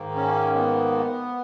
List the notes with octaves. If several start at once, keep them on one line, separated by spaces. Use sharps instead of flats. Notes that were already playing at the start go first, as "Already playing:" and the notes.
Already playing: G#2 D#3 A#3
C#4
B3